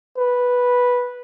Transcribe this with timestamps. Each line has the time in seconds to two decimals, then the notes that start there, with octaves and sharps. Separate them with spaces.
0.18 B4